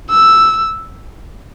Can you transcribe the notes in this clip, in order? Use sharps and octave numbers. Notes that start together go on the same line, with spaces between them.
E6